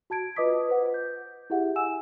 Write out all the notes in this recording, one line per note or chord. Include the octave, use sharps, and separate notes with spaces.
F#4 A5 G#6 D7
F4 B4 D#5 D6 D#6 B6
B4 C5 F#5
G6
E4 G4 G#4 E5 F#5
F#5 G#5 E6 E7